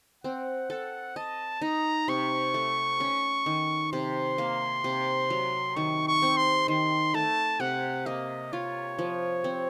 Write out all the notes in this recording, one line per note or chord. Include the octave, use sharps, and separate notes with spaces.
C4 F#5
A4 F#5
D#5 A5
D#4 A#5
C3 C#6
A3
C#4
D#3
C3 C6
A#3
C3
F#3
D#3 C#6
C#6
C4
C6
D#3 C6
A3 A5
C3 F#5
A#3 D#5
F4 C#5
F3
C4